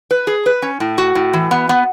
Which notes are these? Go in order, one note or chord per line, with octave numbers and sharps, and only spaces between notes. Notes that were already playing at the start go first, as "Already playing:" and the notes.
B4
G#4
B4
C#4
A2
F#4
A2
E3
B3
B3